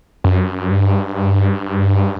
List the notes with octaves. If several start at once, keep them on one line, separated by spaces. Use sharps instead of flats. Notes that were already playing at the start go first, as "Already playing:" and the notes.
F#2
G2